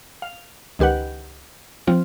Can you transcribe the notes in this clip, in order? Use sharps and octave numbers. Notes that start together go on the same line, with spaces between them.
F5
C#2 D#3 G4 B4 F#5
F3 C4 F4